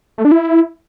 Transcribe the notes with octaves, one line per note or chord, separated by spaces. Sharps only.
A3
D4
E4